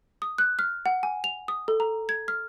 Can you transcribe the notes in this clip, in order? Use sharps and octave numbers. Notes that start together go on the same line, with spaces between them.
D#6
F#6
F6
F#5
G#5
F7
D#6
A4
A#5
G#6
F6